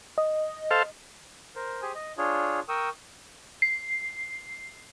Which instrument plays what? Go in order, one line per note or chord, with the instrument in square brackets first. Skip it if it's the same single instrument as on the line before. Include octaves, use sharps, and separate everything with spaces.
[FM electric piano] D#5
[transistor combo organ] A4 C5 F5
[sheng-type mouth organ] A#4 C5
G4 G#4 C5 G#5
D#5
D4 F4 G#4 C#5
A#4 G5 C#6 D#6 E6
[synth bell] C7